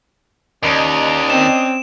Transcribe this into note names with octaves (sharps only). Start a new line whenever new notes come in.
D#2 C#4 D4 D#5 D7
C4 E7